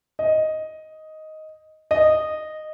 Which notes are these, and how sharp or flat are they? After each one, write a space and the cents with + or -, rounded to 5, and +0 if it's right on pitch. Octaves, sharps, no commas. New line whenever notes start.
D#5 +5
D#5 -10